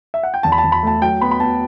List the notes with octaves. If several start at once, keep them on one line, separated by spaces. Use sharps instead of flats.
E5
F#5
G5
E2 A5
B5
A5
E2
B5
A3 A5
F#3 G5
B3 B5
B5
B3 A5